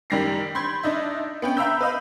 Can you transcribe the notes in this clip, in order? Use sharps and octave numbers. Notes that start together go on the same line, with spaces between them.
F#2 D#3 G3 G5 A#6 C7
B5 C6 G6 G#6
D4 D#4 E5
B3 C#4 G5
E5 F5 A#5 B5 E6 G6
B4 D#5 F5 B5